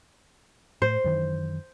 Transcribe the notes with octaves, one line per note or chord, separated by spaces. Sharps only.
A2 C5
F#2 D#3 E3